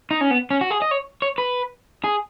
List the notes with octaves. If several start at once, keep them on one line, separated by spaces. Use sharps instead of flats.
D#4
C#4
B3
C#4
F#4
G#4
D#5
C#5
C#5
B4
G#4